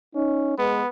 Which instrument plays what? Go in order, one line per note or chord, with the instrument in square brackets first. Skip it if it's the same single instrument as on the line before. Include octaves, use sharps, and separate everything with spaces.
[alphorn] C#4 [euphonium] D#4
[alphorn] G#3 [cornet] B3 [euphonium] B4